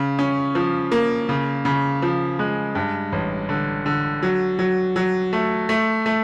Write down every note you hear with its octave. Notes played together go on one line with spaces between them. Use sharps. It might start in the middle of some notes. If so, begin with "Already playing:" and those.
Already playing: C#3
C#4
F3
A#3
C#3
C#3
F3
G#3
G2
A1
D3
D3
F#3
F#3
F#3
A3
A3
A3